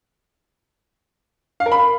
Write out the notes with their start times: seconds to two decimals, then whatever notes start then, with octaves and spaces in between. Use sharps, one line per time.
1.60 F5
1.66 A#4
1.72 B5